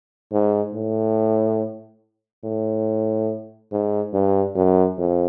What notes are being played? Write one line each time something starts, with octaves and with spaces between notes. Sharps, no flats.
G#2
A2
A2
G#2
G2
F#2
F2